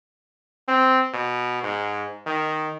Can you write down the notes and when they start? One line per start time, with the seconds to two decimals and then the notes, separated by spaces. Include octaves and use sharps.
0.68 C4
1.13 B2
1.63 G#2
2.26 D#3